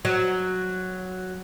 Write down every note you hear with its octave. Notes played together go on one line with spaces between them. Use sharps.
F#3